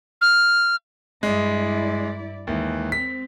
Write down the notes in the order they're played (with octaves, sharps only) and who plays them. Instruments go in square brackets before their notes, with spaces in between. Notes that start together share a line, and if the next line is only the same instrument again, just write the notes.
[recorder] F6
[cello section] G2 E4 D5 [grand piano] G#3
[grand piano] D#2 E3 [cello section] G#3
[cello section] C4 [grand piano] B6